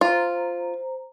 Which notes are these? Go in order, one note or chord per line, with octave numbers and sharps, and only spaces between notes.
F4 C5 A#5